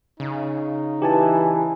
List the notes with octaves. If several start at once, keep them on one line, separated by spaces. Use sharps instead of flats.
C#3 D#4
E3 G4 G#5 A5